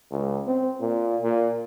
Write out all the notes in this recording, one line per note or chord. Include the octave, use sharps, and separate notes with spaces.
C#2
C4
A#2
A#2